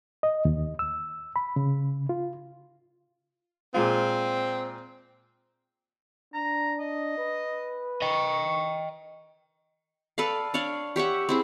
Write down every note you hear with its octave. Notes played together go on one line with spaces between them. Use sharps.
D#5
D#2
E6
B5
C#3
F4
A#2 G#3 C4 F4
D4 A#5
D#5
B4
D#5 G5 C#6
A4 B4 D5 F5
D4 C#5 D5 F5
G4 C#5 E5 F#5
C4 E4 G#4